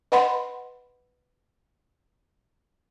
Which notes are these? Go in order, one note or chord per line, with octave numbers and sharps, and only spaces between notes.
B4 D#5 F#5 B5 C6